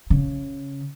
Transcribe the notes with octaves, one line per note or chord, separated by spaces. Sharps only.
C#3